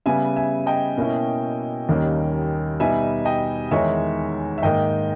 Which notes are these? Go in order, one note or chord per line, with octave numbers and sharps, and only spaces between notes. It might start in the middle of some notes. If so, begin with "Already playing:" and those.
C#3 G3 B3 E5 G#5
E5 G#5
D#5 G5
B2 A#3 C#4 E4
D#2 D#3 G3 A#3 C#4
B2 G3 B3 D#4 E5 G#5
D#5 G5
E2 D#3 G#3 D#4 C#5 E5
E5
G#2 D#3 A#3 D#5 G5